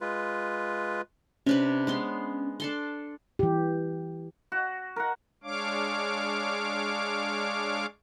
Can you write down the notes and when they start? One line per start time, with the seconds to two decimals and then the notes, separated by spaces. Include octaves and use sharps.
0.01 G#3 F4 B4
1.46 C3 C#4 D4 B4
1.87 G#3 B3 C6
2.60 D4 A4 C6
3.39 E3 G4
4.52 F#4
4.96 A#4 F#5
5.44 G#3 D4 C#5 F5 D6